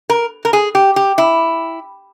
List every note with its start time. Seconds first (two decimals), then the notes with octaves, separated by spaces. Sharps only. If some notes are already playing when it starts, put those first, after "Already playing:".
0.10 A#4
0.45 A#4
0.53 G#4
0.75 G4
0.96 G4
1.18 E4